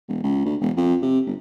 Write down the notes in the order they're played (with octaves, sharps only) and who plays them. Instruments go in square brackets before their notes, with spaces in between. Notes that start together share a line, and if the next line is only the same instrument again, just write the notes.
[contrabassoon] E1
C#2
D2
E1
F2
C3
G1